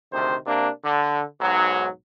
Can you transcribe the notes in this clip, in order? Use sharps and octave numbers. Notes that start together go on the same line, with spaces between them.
D2 C3 D#3 C5
C3 A#3 D4
D3
B1 G#2 F#3